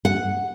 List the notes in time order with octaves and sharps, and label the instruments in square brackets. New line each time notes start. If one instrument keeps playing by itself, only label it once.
[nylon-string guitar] F#5